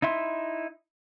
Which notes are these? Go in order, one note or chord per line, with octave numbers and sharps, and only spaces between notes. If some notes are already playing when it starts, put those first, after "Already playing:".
D#4 E4 E5 C6